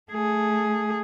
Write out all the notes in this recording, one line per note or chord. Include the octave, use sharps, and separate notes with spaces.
A3 G#4